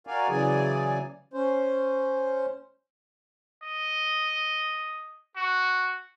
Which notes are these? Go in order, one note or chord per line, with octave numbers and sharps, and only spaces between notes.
F#4 A#4 D5 F5 G#5
C#3 E3 F#3 G#4 D5 G#5
C#4 C5
D#5
F#4